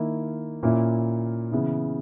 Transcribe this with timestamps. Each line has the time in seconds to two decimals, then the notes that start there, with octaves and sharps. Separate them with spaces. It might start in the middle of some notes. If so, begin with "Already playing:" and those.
Already playing: D#3 A#3 E4
0.63 A#2 A#3 C#4 E4
1.52 C#3 E3 B3 E4